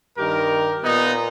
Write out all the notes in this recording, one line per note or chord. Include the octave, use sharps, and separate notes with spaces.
G2 D#3 G4 A#4
A#2 B3 D#4